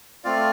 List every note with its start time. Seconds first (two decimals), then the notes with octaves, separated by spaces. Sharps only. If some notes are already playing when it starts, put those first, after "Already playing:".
0.24 A3 C4 F4 D5 F5